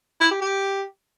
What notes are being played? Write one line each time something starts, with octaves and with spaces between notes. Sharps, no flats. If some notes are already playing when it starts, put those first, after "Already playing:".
E4
G4
G4